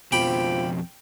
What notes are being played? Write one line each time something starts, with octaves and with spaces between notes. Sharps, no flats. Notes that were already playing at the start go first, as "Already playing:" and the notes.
F2 B2 F3 G4 G5 B5